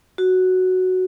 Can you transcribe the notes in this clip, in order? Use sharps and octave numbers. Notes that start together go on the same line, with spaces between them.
F#4